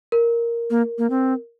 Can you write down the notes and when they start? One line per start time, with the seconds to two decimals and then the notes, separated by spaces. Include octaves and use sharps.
0.12 A#4
0.70 A#3
0.98 A#3
1.10 C4